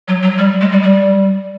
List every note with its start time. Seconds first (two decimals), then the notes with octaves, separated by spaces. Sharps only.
0.08 F#3
0.23 F#3
0.38 G3
0.61 G#3
0.72 G3
0.83 G3